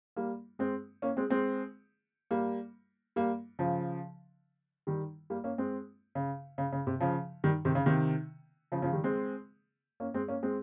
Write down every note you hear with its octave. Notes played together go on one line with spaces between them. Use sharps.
G3 A#3
G#3 C4
A#3 C#4
G#3 C4
G#3 C4
G3 A#3
G3 A#3
C#3 F3
D#3 G3
G3 A#3
A#3 C#4
G#3 C4
C#3
C#3
C#3
C3
C#3 F3
D#3 G3
C3 D#3
C#3
C3 D#3
C#3 F3
C#3 F3
D#3 G3
G#3 C4
A#3 C#4
G#3 C4
A#3 C#4
G#3 C4